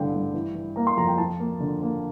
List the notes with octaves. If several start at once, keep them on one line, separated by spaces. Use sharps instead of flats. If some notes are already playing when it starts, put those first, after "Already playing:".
Already playing: A1 G2 D3 F5 G5
G2
E3
E3
A#3 A#5
C6
F2 A#5
G5
F3 A5
A#3
D3
A#3